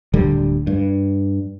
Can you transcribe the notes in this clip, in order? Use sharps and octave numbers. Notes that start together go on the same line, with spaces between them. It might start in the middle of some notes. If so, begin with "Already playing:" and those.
D1 D3 G3
G2